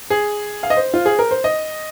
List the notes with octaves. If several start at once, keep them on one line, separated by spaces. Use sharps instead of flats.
G#4
F5
D#5
C5
F4
G#4
A#4
C5
D#5